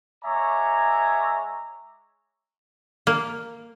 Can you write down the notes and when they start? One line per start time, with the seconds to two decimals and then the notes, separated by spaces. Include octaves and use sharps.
0.24 G#3 C#5 E5 G#5 A#5 D6
3.07 A#3